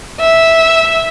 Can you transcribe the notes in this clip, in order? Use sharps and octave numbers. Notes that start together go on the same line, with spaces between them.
E5